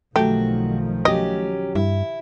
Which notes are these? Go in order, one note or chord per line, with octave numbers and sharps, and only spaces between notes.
B1 D#3 F3 F#3 A3 F#4 G4
F#3 C#4 G4 D#5
G2 E4